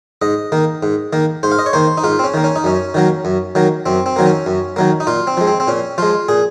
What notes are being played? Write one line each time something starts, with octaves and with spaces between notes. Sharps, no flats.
G#2 D#5
D#3 A#3
G#2
D#3 A#3
G#2 C5
F5
D#5
C#5
D#3 A#3 C5
D#4
G#2 F4
C4
C#4
D#3 A#3
C#4
D#4
F#2 C#4
D#3 F#3 A#3
F#2
D#3 F#3 A#3
F#2 C4
C4
D#3 F#3 A#3
C#4
F#2
D#3 F#3 A#3
D#4
A#2 F4
C4
F3 G#3
C4
C4
A#2 C#4
F3 G#3 F4
A#2 G#4